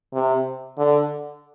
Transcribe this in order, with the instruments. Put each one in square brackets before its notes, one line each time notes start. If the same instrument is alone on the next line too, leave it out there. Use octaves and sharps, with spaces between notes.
[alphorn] C3
D3